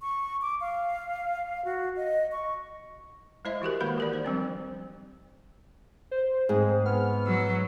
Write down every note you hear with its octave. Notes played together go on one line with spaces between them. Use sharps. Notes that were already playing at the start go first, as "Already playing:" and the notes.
C#6
D6
F5
F#4
D#5
C#6
G#3 E4 C5 D#5 E5
E3 F#4 G4 A#4
D#3 G#3 A#3 C5 F#5 B5
G4 A#4 D5
D#4 C5
F3 G3 C4 D4
C5
G#2 C4 G#4
B3 F6
F#3 E6